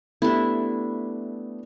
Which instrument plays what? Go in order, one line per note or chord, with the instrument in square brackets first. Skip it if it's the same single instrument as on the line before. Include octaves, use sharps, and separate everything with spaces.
[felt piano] A3 B3 G4 [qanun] D4 E4